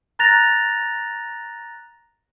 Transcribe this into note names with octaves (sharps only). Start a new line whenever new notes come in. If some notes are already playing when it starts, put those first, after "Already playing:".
A#5 F#6 A6 A#6 F7